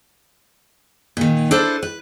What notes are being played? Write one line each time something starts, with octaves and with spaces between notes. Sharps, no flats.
A#2 D#3
D4 E4 A4 B4 C5
B4